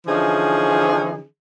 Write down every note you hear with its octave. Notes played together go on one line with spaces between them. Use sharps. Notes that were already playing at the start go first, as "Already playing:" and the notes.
D3 E3 F3 C#4 D#4 G#4